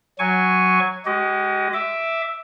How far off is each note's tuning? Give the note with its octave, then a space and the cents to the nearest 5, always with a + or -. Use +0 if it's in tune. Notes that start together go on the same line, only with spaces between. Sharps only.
F#3 +0 G#5 -5 C#6 +5
G#3 +0 G4 -45 D#5 +0
E5 +0 D6 +5